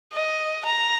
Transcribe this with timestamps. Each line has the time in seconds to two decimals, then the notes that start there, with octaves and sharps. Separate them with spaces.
0.13 D#5
0.65 A#5